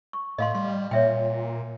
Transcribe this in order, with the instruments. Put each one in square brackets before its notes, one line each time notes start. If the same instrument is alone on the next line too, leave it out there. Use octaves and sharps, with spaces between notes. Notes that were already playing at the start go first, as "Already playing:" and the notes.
[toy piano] C#6
[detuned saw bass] A2 [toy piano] D#5 F5 C6
[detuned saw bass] G3 [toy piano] C6
[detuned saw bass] A#2 [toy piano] C#5 E5 G5